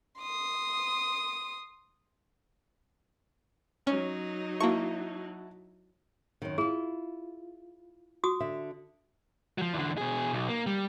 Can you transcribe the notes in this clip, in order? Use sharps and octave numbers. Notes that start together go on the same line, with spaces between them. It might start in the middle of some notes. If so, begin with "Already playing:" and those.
C6 D#6
F#3 C#4 D#4
A#3 E4 F#4 A5 C#6
F#2 D#3
E4 F4 G#4
F#4 D#6
D3 E5
F3 F#3
E2 D3
B2 G#4
B1
A#3
G3